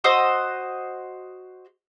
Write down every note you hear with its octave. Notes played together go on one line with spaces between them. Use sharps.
F#4 C5 D#5 E6